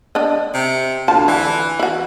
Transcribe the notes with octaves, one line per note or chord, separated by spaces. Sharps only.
D4 D#5
C3
D2 F4 A5
D3 E3
E4 F#4